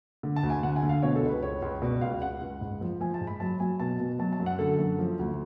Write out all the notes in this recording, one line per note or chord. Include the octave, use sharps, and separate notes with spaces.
D3
A5
D2
G#5
D3 F#5
G#5
D3
F5
B2 C#5
A4
C#2
B4
C#2 C#5
C#2
B2 D5
C#2 F5
C#2 F#5
C#2
G#2
F3
F3 G#5
A5
G#2
B5
F#3 A5
F#3 G#5
B2 A5
B2
F#3 A5
A5
F#2
F#5
D3 A4
F#2
F3
D2